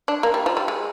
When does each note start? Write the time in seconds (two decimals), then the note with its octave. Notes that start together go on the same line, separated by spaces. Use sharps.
0.08 D4
0.23 A#3
0.34 G3
0.46 F3
0.57 G3
0.68 G#3